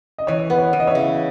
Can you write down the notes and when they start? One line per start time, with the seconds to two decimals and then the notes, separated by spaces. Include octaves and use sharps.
0.18 D#5
0.27 E3 C#5
0.50 B3 B4
0.58 C#5
0.73 E3
0.80 D#5
0.87 C#5 E5
0.95 C#3